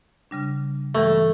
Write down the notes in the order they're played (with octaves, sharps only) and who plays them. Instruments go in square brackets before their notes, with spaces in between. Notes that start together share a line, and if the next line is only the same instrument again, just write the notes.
[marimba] C#3 G3 D4
[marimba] G2 E3 G3 [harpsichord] A3